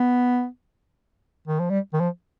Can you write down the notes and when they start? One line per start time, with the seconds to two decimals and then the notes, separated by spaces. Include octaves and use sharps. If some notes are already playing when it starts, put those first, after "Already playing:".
Already playing: B3
1.47 D#3
1.60 F3
1.70 G3
1.93 D#3
2.00 F3